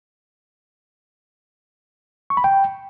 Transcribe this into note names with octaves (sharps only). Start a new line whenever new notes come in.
C#6
B5
G5